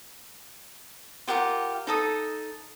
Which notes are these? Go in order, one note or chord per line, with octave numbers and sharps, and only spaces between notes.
F4 G4 A#4 F#5
D#4 A4 D#6